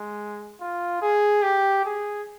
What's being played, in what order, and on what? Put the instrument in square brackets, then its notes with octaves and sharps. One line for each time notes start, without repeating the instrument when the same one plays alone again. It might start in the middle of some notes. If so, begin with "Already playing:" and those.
Already playing: [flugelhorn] G#3
F4
G#4
G4
G#4